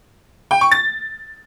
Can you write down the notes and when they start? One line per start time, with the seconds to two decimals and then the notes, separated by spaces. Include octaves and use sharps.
0.51 G5
0.61 C#6
0.71 A6